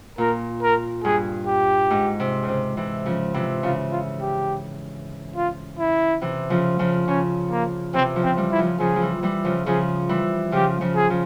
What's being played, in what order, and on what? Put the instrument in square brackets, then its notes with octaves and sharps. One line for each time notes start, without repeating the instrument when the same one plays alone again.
[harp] A#2 [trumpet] A#4
[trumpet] A#4
[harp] G2 [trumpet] G#4
[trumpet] G4
[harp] G#2
C3
C#3
C3
C3 E3
C#3 F3
C3 E3
[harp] C#3 [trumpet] F4
[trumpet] F4
G4
F4
E4
[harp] C3 E3
C#3 F3
C#3 F3
[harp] C#3 [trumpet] C#4
[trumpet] A#3
[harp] C3 E3 [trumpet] C4
[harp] C#3 F3
[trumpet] C4
[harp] E3 G3
[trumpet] E4
[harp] C#3 F3
[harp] C#3 F3 [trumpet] G#4
[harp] F3
E3 G3
E3 G3
C#3 F3
[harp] C#3 F3 [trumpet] G#4
[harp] E3 G3
[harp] C#3 F3 [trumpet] G4
[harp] C#3 F3
[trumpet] G#4
[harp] C#3 F3